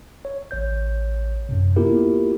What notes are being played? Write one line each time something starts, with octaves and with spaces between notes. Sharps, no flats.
C#5
A1 C#5 G6
F#2 A2 C3
A#3 B3 E4 F4 G4 A#4